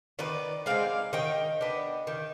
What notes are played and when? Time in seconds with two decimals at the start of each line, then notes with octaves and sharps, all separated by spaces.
0.19 D#3 B4 D5
0.66 G#3 C4 D#4 D5 F5
1.13 D#3 D#5 G5
1.61 B3 D4
2.07 D#3